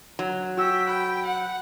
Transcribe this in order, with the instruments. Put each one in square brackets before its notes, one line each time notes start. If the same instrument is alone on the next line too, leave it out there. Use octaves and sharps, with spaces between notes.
[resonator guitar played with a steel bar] F#3
[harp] F#4 E6 [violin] G5 B6
[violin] G5 [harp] B5
[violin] F#5